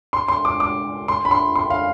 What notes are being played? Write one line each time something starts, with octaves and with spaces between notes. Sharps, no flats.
C6
C6
D6
D6
C6
B5
C6
C6
F5